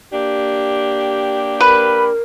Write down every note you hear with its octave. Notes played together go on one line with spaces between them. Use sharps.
A#3 D4 G4
A#4 B4 B5